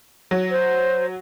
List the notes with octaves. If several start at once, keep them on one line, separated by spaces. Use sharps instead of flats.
F#3
C5